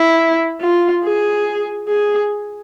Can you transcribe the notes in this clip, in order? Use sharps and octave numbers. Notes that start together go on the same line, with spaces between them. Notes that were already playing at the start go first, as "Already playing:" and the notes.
Already playing: E4
F4
G#4
G#4